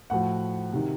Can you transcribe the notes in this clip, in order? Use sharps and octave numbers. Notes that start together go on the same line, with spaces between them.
A2 F3 F#4 F#5
C3 D#3